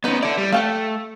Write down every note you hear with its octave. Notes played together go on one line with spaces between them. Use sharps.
B3 C#4 D#4 B4
E4 A4 D5
G3
A3 F5 G5 A5